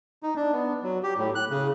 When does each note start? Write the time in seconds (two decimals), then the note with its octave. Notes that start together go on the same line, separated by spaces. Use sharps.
0.23 D#4
0.36 D4
0.52 B3
0.83 F#3
1.03 G4
1.17 A2
1.35 F#6
1.50 C#3